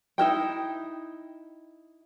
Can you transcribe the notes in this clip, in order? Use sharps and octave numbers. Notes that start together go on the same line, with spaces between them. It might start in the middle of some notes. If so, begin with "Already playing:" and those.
D#4 E4 A#4 G5